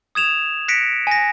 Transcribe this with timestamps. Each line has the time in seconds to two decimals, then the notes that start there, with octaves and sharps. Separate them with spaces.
0.15 D#6 G#6 E7 F7
0.68 F#6 A#6 B6 C#7 D7
1.07 G#5 A#6